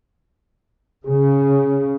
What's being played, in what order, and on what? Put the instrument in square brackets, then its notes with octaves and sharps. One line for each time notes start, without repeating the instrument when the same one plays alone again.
[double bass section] C#3 [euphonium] G#4